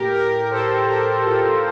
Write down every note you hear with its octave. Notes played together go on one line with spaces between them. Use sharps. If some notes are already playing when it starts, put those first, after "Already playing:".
Already playing: A2 G4 A#4
G4 A#4
A2 A4 C5
G4 A#4
A2 F4 A4